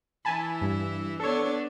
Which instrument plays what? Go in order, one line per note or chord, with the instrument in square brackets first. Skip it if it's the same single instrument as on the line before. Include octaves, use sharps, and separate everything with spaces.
[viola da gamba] E3 E4 [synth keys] G#5 A5 B5
[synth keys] G2
[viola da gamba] B3 D4 [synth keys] A4 C#5